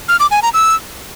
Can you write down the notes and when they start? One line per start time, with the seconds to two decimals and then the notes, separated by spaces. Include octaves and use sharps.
0.09 F6
0.20 D6
0.31 G#5
0.42 A#5
0.54 E6